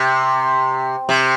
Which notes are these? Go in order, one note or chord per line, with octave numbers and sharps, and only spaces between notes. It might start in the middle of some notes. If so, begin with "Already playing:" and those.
Already playing: C3
C3